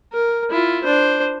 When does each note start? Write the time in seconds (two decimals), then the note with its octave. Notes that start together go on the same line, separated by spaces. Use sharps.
0.13 A#4
0.50 E4 F4
0.84 D4 C5